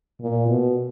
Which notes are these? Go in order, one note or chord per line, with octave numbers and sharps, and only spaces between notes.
A#2
B2